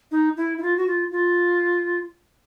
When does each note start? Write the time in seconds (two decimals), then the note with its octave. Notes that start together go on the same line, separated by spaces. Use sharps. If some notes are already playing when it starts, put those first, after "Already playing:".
0.12 D#4
0.37 E4
0.58 E4
0.62 F4
0.77 F#4
0.87 F4
1.12 F4